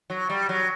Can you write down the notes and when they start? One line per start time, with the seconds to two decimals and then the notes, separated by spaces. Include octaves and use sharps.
0.10 F#3
0.30 G3
0.49 F#3